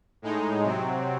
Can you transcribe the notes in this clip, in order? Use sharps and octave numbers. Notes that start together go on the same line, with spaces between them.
A2 G#3 D#4
C3 F#3 C4